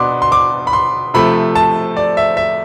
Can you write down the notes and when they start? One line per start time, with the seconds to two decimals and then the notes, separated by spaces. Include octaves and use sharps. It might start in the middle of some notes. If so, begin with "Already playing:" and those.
Already playing: B2 B3 D4 C6 D6
0.22 C6
0.32 D6
0.67 B5
0.73 C6
1.14 C3 F3 A3 B5
1.55 A5
1.97 D5
2.17 E5
2.37 E5